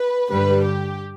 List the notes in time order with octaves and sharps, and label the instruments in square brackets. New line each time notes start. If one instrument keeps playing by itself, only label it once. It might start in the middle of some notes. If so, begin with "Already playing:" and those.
Already playing: [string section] B4
G2 D3 G3 B4
G4